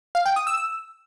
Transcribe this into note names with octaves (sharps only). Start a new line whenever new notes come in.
F5
G5
D#6
E6
E6